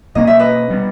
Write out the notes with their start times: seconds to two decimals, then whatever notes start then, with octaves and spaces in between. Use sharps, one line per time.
0.15 B2 A#3 C#4 D#5
0.27 E5
0.39 B4 D#5
0.70 G3 B3